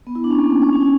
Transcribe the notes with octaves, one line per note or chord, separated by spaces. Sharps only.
B3
E4
D4
C#4
A#3
C#4
C#4
C#4
D#4